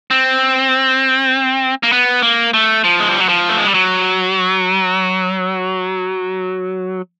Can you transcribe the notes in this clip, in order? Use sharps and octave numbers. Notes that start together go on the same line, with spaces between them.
C4
A#3
B3
A#3
A3
F3
G#3
G3
F#3
F3
A3
G#3
G3
F#3